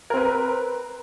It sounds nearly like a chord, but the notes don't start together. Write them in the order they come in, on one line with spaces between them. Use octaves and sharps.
A#4 C4 B4